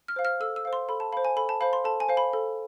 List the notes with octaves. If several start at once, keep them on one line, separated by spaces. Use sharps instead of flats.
F6
C5 F5
F6
A4 E6
E6
C5 F5
C6
A4 B5
A5
C5 F5 B5
G#5
A4 B5
A5
C5 F5 B5
C6
A4 A5
G#5
C5 F5
B5
A4